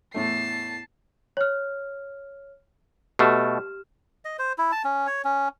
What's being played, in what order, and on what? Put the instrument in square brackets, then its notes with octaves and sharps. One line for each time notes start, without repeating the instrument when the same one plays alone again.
[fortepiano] E2 A2 A3 [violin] A5 C7
[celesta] C#5 F6
[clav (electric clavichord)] B2 A3 [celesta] G4 F6 E7
[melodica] D#5
C5
E4
A5
C#4
C#5
C#4